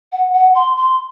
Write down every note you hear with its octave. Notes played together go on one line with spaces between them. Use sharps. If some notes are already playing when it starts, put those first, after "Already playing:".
F#5
F#5
C6
C6